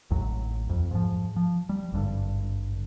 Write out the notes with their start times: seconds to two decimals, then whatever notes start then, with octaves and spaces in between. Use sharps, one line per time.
0.11 A1 D#2 F#3
0.69 F2
0.91 G#2 F3
1.36 F3
1.69 G3
1.92 G#1 G2 D3